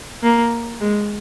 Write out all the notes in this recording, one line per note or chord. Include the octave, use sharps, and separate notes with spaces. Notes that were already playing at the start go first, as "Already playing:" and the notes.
A#3
G#3